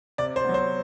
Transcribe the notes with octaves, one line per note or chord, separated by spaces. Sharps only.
C3 D5
C5
F#3 B3
C5